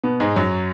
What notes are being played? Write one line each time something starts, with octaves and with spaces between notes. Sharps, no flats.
B2 B3
G#2 G#3
F#2 F#3